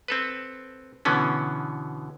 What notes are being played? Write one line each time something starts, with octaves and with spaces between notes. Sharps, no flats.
C4 A4 B4
B2 D3 E3 B3 C#4